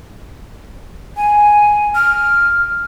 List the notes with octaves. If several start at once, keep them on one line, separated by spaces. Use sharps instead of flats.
G#5
F6